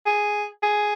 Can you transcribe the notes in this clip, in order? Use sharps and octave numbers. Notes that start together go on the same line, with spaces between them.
G#4
G#4